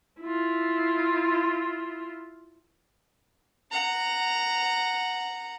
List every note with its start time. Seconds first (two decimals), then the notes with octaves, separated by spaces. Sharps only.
0.21 E4 F4
3.71 F#5 A#5